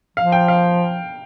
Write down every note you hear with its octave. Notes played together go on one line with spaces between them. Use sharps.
F3 F5
G5
F5